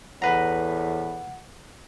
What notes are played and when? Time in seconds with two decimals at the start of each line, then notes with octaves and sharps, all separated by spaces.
0.22 E2 A2 B4 F#5 A#5